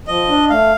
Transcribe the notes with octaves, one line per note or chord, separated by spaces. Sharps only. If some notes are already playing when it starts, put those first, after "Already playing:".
F3 D#5
D4
A3 F5